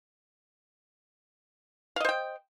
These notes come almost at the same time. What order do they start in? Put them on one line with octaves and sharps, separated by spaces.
F5 D#5 C5 G5